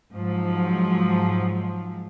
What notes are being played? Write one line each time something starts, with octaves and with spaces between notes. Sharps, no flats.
G#2 F3 F#3